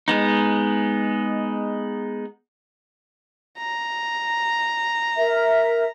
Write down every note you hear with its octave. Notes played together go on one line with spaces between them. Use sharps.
G#3 B3 D#4
A#5
A#4 E5